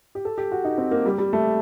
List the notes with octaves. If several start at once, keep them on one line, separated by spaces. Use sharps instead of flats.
G4
A4
G4
F#4
D#4
C4
A#3
G3
G3
A3